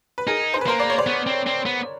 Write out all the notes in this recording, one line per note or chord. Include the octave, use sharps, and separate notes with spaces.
B4
D#4 G#4 A#4
C5
B4
A#3 A#4 C5
D5
C#5
C5 D5
B3
C4
C4
B3